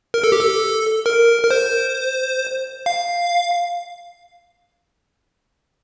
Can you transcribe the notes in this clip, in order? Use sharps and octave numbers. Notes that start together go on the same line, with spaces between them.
A#4
A4
G4
A4
A#4
A#4
C5
F5